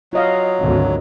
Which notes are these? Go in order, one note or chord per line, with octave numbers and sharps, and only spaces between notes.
F#3 F4 D#5 F5
G#1 D2